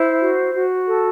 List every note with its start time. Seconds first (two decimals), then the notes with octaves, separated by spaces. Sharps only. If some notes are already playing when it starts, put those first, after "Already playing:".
Already playing: E4 C5
0.20 F#4
0.54 F#4
0.87 A4